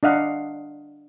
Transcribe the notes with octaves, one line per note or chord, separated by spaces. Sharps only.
D4 D#5 F5 F#5